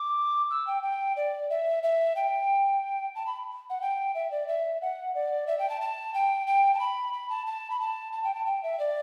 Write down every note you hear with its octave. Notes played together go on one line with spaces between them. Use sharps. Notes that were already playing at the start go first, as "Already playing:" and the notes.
Already playing: D6
E6
G5
G5
D5
E5
E5
G5
A5
B5
F#5
G5
E5
D5
E5
F#5
D5
E5
G5
A5
A5
G5
G5
A5
B5
B5
A5
A5
B5
A5
A5
G5
A5
G5
E5
D5